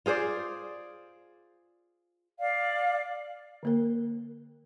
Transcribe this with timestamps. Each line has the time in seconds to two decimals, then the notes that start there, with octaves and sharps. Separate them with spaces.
0.06 F4 G#4 C5 D5
2.40 D5 F5
3.63 D3 A#3 A#4